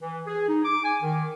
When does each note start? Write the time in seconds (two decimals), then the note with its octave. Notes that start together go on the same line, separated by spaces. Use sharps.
0.02 E3
0.27 G#4
0.48 D#4
0.65 D6
0.84 G#5
1.03 D#3